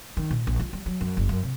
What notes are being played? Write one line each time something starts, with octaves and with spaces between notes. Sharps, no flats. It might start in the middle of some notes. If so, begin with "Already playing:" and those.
D#3
A#2
A#1
F4
G3
F#3
F#2
F#1
F#2
C3